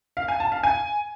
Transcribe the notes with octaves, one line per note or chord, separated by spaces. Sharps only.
F5
G#5
A5
F5
G#5